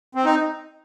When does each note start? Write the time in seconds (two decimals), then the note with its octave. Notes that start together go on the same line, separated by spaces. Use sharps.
0.15 C4
0.25 D#4